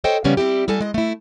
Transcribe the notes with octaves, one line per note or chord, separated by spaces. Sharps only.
A4 C5 C#5 D#5 G5
C#3 F3 G3 B3 C#4
G3 C4 E4 G4
G3 A3 F#4 A4 G#5
G#3 D#5
A3 E4